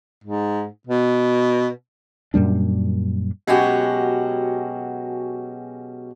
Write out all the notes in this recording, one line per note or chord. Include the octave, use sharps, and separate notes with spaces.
G#2
B2
F#2 A#2 G3 D4
B2 F#3 G#3 C#4 F#4 G4